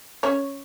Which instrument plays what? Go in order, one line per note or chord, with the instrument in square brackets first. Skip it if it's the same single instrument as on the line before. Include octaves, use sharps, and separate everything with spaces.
[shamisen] C#4 C#5